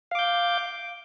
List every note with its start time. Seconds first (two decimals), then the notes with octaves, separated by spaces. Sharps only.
0.11 F5
0.15 D6
0.19 G6